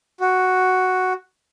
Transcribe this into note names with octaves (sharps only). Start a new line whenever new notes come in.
F#4